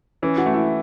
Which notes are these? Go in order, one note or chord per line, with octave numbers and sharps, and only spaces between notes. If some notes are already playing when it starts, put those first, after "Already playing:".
E3 C#4
F#4
A3
E4